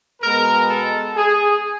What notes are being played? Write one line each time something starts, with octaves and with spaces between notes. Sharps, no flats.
B2 G#3 B3 A#4
A4
G#4